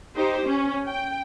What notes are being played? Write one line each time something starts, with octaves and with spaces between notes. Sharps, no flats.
D#4 G4 C5
C#4
G5